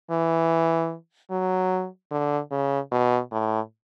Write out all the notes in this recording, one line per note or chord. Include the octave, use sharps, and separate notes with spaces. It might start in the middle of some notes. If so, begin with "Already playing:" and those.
E3
F#3
D3
C#3
B2
A2